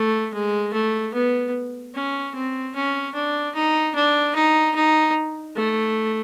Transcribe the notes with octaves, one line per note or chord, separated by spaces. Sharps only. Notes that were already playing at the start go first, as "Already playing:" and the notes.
Already playing: A3
G#3
A3
B3
C#4
C4
C#4
D4
D#4
D4
D#4
D#4
A3